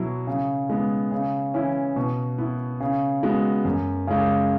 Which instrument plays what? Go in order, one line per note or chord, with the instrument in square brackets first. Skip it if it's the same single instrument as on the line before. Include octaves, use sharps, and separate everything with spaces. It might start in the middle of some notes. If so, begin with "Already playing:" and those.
Already playing: [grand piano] B2 F#3 E4
C#3
G#3 B3
C#3
E3 C#4 E4
B2
B3 E4
C#3
G#3 B3 F#4
F#2
C#3 G#3